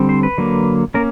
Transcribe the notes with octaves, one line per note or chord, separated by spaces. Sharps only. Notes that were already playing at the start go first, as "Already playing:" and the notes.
Already playing: D3 G3 C4
C5
B4
D3 F#3 A#3
A#3 C#4 A#4